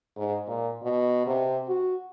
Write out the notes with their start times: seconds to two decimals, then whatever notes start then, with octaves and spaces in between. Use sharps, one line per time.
0.16 G#2
0.47 A#2
0.82 B2
1.27 C3
1.68 F#4